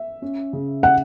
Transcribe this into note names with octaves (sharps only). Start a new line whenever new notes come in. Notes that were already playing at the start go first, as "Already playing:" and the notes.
Already playing: E5
C#4
C#3
C#3 F#5